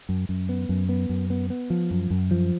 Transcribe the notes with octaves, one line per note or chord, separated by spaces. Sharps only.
F#2
F#2
B3
F#2
B3
F#2
B3
B3
F3
F#2
F#2
F3